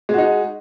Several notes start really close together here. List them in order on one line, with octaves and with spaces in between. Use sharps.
G#3 F#4 D#4